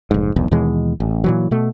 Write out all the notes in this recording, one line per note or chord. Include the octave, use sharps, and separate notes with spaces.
F1 G#2
D#1 B1 E2
D#2 B2 E3 G#3
A1
A#2 E3 F#3
B2 A3